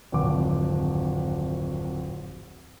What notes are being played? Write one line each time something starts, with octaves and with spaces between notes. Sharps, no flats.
D1 G#1 F2 D6